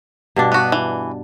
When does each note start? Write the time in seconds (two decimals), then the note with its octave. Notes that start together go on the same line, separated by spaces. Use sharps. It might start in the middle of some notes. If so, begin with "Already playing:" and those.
0.36 G2 B2 D4
0.52 B3 F#4
0.72 E3